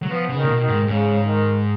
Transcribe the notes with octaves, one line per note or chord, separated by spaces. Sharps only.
F#3
F3 B3
C#3
D#3
A#2
B2
D#3
G#2
G#2 C#3
D#3